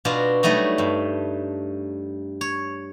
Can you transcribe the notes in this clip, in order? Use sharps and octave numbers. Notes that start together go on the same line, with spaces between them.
B2 D4 F4 F#4
F#3 G3 A3 D#4 F#4
G2
C#5